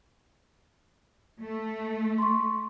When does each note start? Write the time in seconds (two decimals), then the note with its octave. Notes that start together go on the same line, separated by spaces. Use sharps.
1.42 A3
2.18 C6 C#6